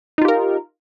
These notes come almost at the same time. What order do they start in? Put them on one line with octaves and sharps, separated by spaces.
D#4 F4 G4 A#4